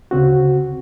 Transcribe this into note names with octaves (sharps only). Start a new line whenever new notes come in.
D2 C#3 C4 F#4